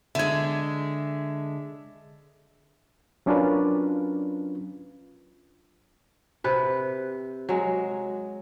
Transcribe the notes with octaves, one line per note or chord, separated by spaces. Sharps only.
D3 G#3 E5 G#6
F#3 C#4 D4 F4 A#4 B4
C3 B4
F#3 G#3